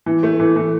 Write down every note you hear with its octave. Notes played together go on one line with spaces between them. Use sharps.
E3
A3
E3
E3